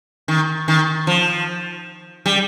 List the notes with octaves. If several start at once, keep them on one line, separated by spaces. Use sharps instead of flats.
D#3
D#3
F3
G3